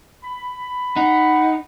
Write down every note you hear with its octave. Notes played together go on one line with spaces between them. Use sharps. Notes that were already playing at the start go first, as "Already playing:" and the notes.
B5
D#4 F#5